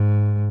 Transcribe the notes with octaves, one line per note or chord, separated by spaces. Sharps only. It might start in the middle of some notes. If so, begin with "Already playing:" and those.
Already playing: G#2